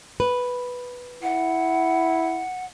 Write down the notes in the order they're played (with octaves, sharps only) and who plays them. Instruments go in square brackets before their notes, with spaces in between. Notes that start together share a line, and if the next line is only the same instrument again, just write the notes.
[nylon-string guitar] B4
[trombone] E4 [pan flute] F#5